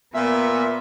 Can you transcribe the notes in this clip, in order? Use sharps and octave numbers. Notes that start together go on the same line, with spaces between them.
A#2 B3 E5